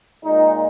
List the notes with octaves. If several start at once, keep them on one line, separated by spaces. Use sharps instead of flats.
A#2 G#3 D#4